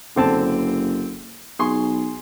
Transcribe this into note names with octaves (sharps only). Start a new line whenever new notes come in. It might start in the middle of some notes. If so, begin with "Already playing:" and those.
F#1 D3 C4 A5
B1 G#4 C6 C#6